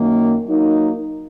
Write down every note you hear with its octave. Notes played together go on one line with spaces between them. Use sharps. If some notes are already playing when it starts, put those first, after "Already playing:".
Already playing: F#2 D#3 A#3
F#3 A#3 D#4 A#4